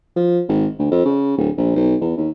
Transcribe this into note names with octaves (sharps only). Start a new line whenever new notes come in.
F3
G#1
D2
F2
C#3
D1
A#1
B1
E2
D#2